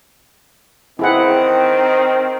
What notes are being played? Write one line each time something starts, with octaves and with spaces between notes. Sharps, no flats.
D#3 C4 E4 G#4 F#5